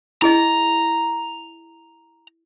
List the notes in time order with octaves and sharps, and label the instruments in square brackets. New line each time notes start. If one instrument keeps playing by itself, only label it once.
[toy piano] E4 G#4 D#5 [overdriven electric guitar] A#5